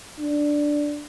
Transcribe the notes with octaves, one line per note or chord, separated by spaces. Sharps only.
D4